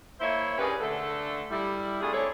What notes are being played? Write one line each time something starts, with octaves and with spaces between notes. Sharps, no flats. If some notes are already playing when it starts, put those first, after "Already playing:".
A#3 E4 C5 C#5 E5
C#4 D4 G4 G#4 A#4 B4
D3 A3 A4
G3 E4
C3 A3 D4 F4 G#4
C4 D4 E4 G#4 A4 C#5